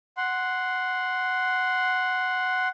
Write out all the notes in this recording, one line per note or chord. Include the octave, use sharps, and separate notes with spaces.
F#5 C6